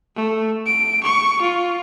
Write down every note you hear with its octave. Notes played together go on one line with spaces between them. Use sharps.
A3
D7
C#6
F4